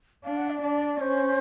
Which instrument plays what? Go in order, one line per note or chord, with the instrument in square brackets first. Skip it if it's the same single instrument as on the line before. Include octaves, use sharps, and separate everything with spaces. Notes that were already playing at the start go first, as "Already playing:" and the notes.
[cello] D4 [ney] F5
[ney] F#5
D5
[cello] D4
[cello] C#4 [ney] C5